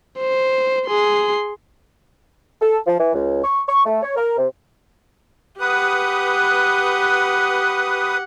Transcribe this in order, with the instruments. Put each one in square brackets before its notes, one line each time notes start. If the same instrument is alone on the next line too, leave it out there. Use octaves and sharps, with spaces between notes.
[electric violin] C5
G#4 C6
[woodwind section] A4
F3
E3
C#2
C#6
C#6
A3
C#5
A#4
C3
[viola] G4 F#5 [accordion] B4 D#6